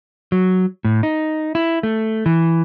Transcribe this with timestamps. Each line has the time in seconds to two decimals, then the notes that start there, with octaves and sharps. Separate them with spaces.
0.32 F#3
0.85 A2
1.03 D#4
1.55 E4
1.83 A3
2.26 E3